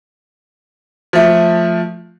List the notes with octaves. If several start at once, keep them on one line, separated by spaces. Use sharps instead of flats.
F3 A3